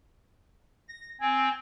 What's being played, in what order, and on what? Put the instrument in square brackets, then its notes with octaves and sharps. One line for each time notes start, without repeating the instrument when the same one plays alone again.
[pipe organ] A#6
[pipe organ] C4 [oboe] G#5